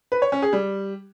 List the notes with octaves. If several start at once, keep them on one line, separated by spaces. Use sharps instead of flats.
B4
C#5
C#4
G#4
G3